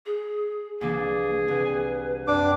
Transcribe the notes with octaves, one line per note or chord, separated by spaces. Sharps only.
G#4
C2 E3 A#3 D4 G#4
C2 B4
F#2 C4 D4 D6